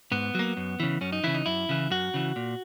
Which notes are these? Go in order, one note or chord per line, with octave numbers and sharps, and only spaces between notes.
G#2 B3
F#3 A#3
F#2
C#3 E3
F#2 C#4
D#4
C#3 E3 E4
D#4
F#2 E4
C#3 E3
F#2 F#4
C#3 E3
A#2